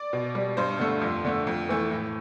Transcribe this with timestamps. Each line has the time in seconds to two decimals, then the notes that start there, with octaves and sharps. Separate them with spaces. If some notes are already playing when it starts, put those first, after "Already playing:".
Already playing: D5
0.13 B2
0.35 G3
0.57 G2 C5
0.80 D3 A3
1.02 F2
1.25 D3 A3
1.47 F2
1.69 E3 A3
1.91 A2